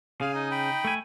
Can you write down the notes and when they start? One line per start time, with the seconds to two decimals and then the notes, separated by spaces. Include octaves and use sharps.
0.21 C#3 G#4 F5 G#5
0.35 D#4
0.51 G5 B5
0.85 A3 G#5